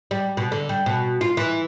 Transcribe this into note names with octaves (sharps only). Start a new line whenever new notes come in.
G3
B2
D3
G3
B2
F4
E3